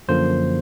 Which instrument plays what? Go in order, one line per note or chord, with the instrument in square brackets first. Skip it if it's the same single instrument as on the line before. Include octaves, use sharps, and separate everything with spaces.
[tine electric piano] F#2 D3 F3 A#3 C5